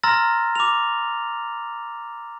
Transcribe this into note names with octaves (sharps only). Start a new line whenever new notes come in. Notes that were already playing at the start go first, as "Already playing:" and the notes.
A#5 C6 E6 F6 A6 A#6
D6 F7